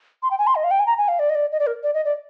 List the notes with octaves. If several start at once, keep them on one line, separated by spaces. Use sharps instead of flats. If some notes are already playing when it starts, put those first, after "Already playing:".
C6
G5
G#5
C6
D#5
F5
G5
G#5
A#5
G#5
F5
D5
D#5
D5
D#5
D5
A#4
D5
D#5
D5